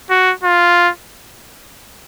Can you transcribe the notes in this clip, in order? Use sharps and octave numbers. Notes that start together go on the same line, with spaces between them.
F#4
F4